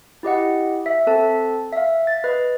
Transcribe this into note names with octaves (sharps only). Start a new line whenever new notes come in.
E4 G4 D#5 F#5
E5
C4 A4 A5
E5 F5
A6
B4 D#5